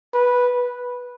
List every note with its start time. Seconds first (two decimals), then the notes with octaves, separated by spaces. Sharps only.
0.14 B4